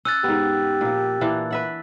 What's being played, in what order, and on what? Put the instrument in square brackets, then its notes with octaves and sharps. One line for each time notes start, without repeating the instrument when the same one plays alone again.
[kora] C#4 [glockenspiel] E6 F#6 A6
[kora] G#2 B3 [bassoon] G4
[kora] A#2 F3
A#2 E3 D4
B4 E5 F#5